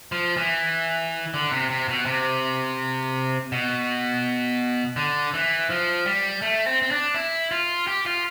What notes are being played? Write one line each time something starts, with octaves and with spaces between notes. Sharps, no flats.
F3
E3
D3
C3
C3
B2
C3
B2
D3
E3
F3
G3
A3
C4
C4
D4
E4
F4
G4
F4